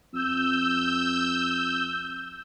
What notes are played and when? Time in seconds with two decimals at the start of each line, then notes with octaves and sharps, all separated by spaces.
0.13 F2 E6 G6